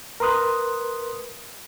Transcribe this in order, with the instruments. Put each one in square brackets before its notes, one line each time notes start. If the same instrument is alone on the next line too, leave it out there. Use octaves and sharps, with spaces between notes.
[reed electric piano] A#4 B4 C6 D#6 F#6